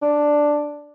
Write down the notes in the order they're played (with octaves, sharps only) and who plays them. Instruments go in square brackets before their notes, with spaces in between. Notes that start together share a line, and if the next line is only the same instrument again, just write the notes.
[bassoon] D4